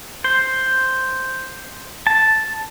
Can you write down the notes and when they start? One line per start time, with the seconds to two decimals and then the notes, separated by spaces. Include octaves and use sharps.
0.24 C5
2.07 A5